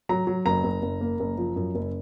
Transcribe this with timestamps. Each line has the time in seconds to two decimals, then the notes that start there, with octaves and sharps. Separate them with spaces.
0.09 F#3 A#5
0.27 F#3
0.46 F#1 A#5
0.64 F#1
0.82 F#1
1.01 A#3
1.20 F#1
1.38 F3
1.56 F#2
1.75 F#1